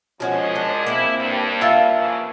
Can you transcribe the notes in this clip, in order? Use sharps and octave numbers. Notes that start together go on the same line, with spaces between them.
F#2 F3 G#3 C#4 F#4
D4
A#3 C4 E4 C5
G2
A#3 F4 E5 A5
F2 C#3 E3